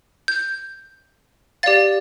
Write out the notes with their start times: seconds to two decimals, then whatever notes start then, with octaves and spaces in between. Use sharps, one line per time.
0.28 G6
1.63 G4 D5 F5 A6